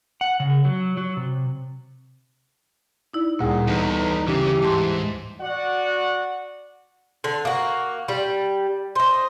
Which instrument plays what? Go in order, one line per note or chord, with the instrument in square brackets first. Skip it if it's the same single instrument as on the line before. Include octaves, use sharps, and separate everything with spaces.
[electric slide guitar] F#5
C#3
F#3
F#3
C3
[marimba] D#4 E4 D5
[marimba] D2 G3 D#6 [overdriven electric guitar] A#2 [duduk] G#4
[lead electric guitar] E2 [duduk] D#4 [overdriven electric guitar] A4 B4
[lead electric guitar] C#3 [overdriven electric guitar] E3 [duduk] G4
[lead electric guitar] G#2 [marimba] A5 C6
[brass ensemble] F#4 D5 F#5
[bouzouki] D3
A#3 F#4
G3
C5 D#5